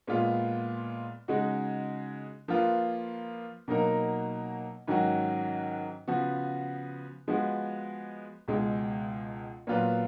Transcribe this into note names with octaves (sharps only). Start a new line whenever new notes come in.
A#2 G#3 B3 F4
C#3 G#3 D#4 F#4
F3 A#3 F4 B4
B2 F#3 A#3 D#4 A#4
G#2 D#3 F#3 C#4 F#4
C#3 F3 B3 F#4
F3 G#3 B3 F#4
C#2 B2 G#3
A#2 F#3 B3 F4 B4